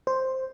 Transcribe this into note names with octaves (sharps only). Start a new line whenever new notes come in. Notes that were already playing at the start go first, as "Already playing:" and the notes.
C5